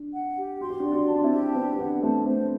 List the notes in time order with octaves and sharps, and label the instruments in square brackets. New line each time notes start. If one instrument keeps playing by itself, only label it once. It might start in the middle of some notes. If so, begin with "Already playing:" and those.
Already playing: [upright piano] D4
[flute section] F#5
G4
[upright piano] F#4 [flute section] C6
[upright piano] G4
D4 F#4
[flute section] D5
[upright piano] D4 F#4
[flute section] A5
[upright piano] D4
C4 E4
[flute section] G4
[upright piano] B3 D4 [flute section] C5
[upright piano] B3 D4 [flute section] F#5
[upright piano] A3 C4 [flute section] A5
[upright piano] A3 C4 [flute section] C5